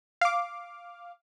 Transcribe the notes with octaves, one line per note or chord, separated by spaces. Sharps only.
F5 D6